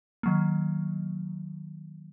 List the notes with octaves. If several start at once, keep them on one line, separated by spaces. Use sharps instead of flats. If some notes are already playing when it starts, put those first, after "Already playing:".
D#3 F#3 A#3